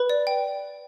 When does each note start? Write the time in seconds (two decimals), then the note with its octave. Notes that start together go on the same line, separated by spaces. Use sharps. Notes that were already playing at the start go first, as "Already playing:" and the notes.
Already playing: B4 B5
0.10 D5
0.27 G5